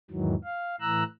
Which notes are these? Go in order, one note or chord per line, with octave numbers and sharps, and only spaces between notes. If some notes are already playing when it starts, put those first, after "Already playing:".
E2 G#2 D#3 E3 F#3
F5
A2 E3 A#5 E6 F#6